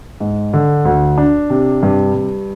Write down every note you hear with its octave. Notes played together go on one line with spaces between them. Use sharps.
G#2
D3
D2
D4
C3
G2
G2